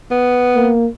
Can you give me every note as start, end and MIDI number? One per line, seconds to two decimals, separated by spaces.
0.11 0.73 59
0.55 0.88 58